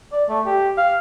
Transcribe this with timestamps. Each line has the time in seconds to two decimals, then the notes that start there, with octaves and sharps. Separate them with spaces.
0.12 D5
0.29 A3
0.46 G4
0.77 F5